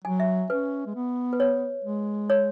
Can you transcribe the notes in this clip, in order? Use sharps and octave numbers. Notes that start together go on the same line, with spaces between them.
F#3 G#5
E5
C#4 B4
G#3
B3
B4
C#5
G#3
C#5